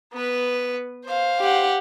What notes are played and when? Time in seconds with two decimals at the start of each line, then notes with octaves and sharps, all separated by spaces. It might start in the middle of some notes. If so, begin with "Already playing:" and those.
0.13 B3 B4
1.04 C5 F5
1.40 G4 F#5